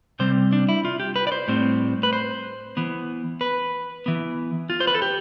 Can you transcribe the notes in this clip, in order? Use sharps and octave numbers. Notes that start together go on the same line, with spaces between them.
C3 G3 C4 C5
D4
E4
F4
G4
B4
D5
C5
A2 G3 C4
B4
C5
E3 B3
B4
E3 B3
F4
C5
B4
A4
G4